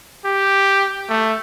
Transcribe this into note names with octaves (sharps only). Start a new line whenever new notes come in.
G4
A3